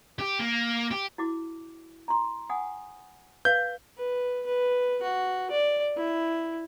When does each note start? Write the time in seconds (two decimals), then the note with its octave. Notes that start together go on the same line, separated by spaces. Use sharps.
0.19 G4
0.39 A#3
0.91 G4
1.18 E4 F#4 D6
2.08 A#5 C6
2.50 F#5 G#5 D#6
3.45 B4 F5 G6
3.97 B4
4.46 B4
5.02 F#4
5.51 D5
5.97 E4